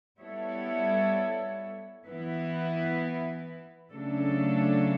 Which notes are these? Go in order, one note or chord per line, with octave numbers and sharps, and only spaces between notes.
G3 B3 E4 A4 C#5
E3 B3 E4 B4
C#3 F#3 A3 D4 A4